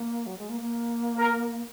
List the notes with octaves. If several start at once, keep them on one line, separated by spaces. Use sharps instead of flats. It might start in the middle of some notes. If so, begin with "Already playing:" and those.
Already playing: A#3
F#3
G#3
A#3
A#3
A#4